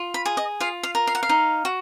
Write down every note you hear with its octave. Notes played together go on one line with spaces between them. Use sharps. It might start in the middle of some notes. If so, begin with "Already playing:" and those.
Already playing: F4
B5
G#4
D#5
F4 F5
F5
A#4
F5
F#5
F5
D#4
F#4